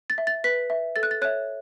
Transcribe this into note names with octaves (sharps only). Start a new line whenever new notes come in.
A6
E5
A6
B4 B6
E5
A4 A6
F#6
A6
C#5 E5 F#6